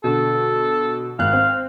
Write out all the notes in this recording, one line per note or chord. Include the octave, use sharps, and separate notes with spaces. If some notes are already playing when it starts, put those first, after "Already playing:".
B2 D3 A4
G#1 F5 F#6
C4